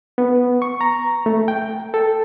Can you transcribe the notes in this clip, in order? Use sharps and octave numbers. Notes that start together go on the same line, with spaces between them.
B3
C#6
A#5
A3
G5
A4